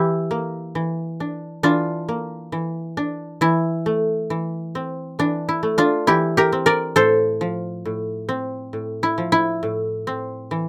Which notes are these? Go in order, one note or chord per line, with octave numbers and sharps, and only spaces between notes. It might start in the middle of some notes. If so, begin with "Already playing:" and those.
Already playing: E3 E4 G4
A#3
E3
D4
E3 D4 F4
A#3
E3
D4
E3 E4
A3
E3
C4
E3 D4
E4
A3
D4 F4
E3 E4 G4
G4 A#4
C4
A#4 D5
A2 A4 C5
F3
A2
C4
A2
E4
F3
E4
A2
C4
E3